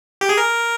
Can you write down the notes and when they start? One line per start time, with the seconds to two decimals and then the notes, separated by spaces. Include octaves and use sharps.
0.21 G4
0.29 G#4
0.37 A#4